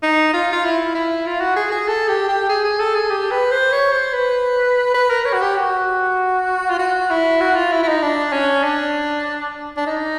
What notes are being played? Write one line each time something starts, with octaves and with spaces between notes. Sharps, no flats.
D#4
F4
F4
E4
E4
F4
F#4
G#4
G#4
A4
G4
G4
G#4
G#4
A4
G#4
G4
B4
C5
C#5
C5
B4
B4
A#4
C#5
F#4
G4
F#4
F4
F#4
E4
F#4
F4
E4
E4
D#4
D4
C#4
D4
D4
D#4